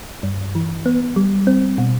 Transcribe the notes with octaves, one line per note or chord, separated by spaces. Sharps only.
G2
E3
B3
G3
C4
B2